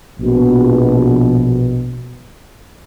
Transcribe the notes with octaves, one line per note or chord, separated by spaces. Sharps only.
A#1 B2